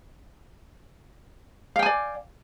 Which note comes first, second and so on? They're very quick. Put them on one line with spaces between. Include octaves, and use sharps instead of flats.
F5 G5 G#5 D5